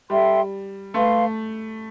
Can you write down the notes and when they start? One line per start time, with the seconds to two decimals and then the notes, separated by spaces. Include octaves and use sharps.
0.10 G3 A4 E5 G5 C6
0.94 A3 B4 F5 C6